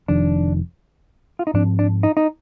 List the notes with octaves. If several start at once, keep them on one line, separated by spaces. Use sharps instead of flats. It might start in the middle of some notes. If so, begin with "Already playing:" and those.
F1 F2 D#3 D4
F4
D#4
G#2 F3 C4 D4
D4
D#4
D#4